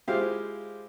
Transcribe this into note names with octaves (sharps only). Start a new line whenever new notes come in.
G#3 E4 F4 G4 C5 F5